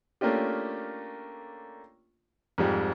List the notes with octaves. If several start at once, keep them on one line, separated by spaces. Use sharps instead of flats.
A3 A#3 C#4 D4 F4 G4
F2 G#2 G3